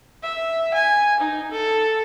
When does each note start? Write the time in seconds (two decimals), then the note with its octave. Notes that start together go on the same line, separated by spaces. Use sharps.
0.23 E5
0.74 G#5
1.20 D#4
1.51 A4